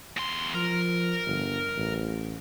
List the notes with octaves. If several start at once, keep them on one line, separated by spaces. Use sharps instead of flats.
E2 C6
F3 A#4
G1
A1